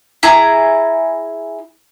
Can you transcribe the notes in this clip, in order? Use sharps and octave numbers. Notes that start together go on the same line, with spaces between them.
E4 G#4 A#5